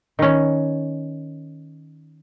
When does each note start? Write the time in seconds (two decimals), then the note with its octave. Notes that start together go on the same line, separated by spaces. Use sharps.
0.19 D#3 C#4